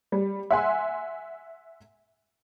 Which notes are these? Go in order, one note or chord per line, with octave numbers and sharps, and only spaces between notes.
G3
E5 F#5 G#5 C6